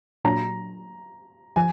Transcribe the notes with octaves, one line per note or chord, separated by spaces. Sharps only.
A#2 F#3 D4 A#5
F3 G#5